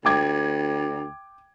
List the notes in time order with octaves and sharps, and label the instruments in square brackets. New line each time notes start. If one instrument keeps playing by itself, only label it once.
[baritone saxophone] D2 [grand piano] G5 D6 G#6